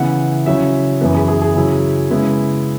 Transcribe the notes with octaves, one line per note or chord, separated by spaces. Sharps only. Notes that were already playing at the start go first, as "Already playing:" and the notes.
Already playing: C#3 E3 B3 E4 F#5
C#3 F#3 C#4 E4 E5
F#2 E3 B3
G#4
G#4
G#4
C#3 F#3 E4
C#3 G#3 B3 E4